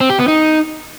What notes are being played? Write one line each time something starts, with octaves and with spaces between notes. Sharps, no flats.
C4
G4
B3
D#4